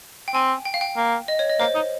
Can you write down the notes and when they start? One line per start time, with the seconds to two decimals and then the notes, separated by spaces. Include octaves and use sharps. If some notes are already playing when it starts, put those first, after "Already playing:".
0.28 G5
0.34 C4 G#5
0.65 G5
0.74 F5
0.81 G5
0.97 A#3
1.28 D#5
1.39 C#5
1.49 D#5
1.60 A#3 C5
1.75 D#4